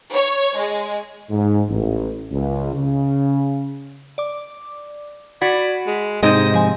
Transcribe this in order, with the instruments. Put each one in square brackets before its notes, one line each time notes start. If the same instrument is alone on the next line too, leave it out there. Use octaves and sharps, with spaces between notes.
[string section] C#5
G#3
[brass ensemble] G#2
A1
C#2
C#3
[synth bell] D5 D6
[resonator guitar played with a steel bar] F#4 [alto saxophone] D5 [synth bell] B5 G#6 B6
[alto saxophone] G#3
[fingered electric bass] G#2 C3 [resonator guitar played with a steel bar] G#3 C4 D#4 [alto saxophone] D#5
[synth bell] F3 G#5